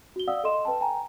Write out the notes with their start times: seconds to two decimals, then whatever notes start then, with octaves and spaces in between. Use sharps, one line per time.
0.16 F#4 G7
0.28 D5 F5 F#5 D#6 E6
0.44 A4 D#5 C6 E7
0.65 B4 G5 A5
0.81 G5 G#5 A#5